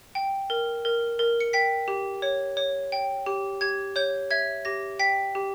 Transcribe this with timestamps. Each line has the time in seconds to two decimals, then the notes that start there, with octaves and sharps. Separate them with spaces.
0.15 G5
0.50 A#4
0.85 A#4
1.19 A#4
1.40 C#7
1.53 G5 B6
1.88 G4
2.22 C#5
2.57 C#5
2.92 G5
3.26 G4
3.61 G4 G#6
3.96 C#5 G6
4.31 E5 G#6
4.65 G4 A#6
4.99 G5 B6
5.35 G4